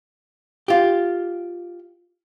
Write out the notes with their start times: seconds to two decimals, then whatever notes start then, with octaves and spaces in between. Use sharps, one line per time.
0.68 F4 G4